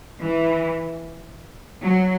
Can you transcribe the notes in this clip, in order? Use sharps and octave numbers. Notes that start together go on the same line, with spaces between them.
E3
F#3